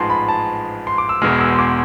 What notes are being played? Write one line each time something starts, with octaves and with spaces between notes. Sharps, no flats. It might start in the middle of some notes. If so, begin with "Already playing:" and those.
Already playing: A1 G#2 F3 G#3 A5 C6
B5
A5
C6
D6
E6
E1 E2 B2 G#3 F6
E6
C6
D6